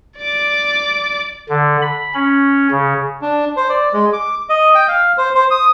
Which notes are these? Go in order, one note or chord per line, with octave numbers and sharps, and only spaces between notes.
D5 D6
D3
B5
C#4
C#3
D4
C5
D5
G#3
D6
D#5
G5
F5
C5
C5
D#6